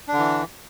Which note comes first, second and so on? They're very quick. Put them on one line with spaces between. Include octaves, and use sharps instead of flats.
D4 D3 E3